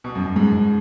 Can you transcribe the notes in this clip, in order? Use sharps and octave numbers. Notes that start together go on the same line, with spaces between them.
B2
F#2
F#2
G#2
F#2
G#2